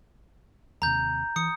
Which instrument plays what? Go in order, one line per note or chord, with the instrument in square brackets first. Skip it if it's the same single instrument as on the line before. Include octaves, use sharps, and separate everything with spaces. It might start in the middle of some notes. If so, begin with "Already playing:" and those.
[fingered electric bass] D#2 C3 [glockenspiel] A#5 G6
[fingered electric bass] E3 [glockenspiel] D#6 C#7